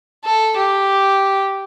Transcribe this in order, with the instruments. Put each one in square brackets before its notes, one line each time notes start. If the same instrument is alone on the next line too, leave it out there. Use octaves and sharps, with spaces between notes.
[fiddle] A4
G4